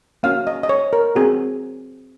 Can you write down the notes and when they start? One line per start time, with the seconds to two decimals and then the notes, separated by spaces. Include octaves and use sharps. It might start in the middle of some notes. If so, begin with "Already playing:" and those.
0.23 A#3 C#4 F#4 F5
0.47 D#5
0.63 D#5
0.69 C#5
0.93 A#4
1.15 C4 F#4 G#4